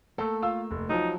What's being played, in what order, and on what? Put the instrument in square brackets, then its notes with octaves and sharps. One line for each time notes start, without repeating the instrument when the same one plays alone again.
[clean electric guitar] A3 A#3 [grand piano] A4
[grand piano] F4 F5 E6
F1
[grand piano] F3 F#3 [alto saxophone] D#4